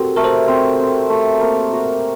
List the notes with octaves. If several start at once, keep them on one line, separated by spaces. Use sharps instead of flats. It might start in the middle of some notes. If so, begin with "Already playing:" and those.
Already playing: C4 F#4 G4 A4 A#4
A3 A#4
A4 C5
C4
C4
A3
A#3
F#4